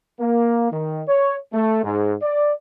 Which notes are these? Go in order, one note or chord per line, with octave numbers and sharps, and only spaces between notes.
A#3
D#3
C#5
A3
G#2
D5